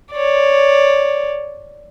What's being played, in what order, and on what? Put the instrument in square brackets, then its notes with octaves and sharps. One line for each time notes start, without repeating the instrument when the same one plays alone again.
[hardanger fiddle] C#5 D5